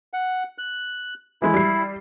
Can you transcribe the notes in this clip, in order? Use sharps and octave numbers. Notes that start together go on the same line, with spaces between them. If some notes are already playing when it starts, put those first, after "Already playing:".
F#5
F#6
E3 G#3 E4
G3 C7